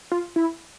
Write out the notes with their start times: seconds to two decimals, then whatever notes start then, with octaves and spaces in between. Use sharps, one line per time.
0.12 F4
0.36 E4